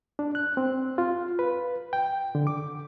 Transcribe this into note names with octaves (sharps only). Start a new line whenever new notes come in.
D4
F#6
C4
F4
B4
G5
D3
D6